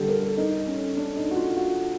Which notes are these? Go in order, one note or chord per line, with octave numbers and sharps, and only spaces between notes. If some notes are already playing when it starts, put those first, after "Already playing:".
Already playing: D3 G3 G4 A4
A#4
A4
D#4
C#4
D4
D#4
F#4
F4
F#4